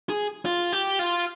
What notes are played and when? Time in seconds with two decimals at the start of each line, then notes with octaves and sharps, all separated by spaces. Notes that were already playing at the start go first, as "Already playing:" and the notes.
0.10 G#4
0.45 F4
0.73 G4
0.99 F4